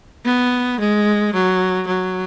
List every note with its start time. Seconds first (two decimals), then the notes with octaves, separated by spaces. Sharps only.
0.25 B3
0.80 G#3
1.33 F#3
1.87 F#3